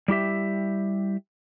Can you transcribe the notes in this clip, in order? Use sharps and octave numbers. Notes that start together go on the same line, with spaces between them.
G3 E4 G4 E5